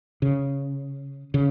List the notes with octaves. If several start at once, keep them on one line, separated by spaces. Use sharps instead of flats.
C#3
C#3